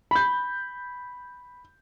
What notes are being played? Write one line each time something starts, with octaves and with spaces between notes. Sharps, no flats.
B5 G6